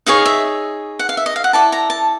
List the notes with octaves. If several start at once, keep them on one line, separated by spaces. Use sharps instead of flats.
D#4 G#4 C#5 F5
E5
F#5
F5
E5
D#5
F5
F#5
E4 A4 D5 A5
A#5
A5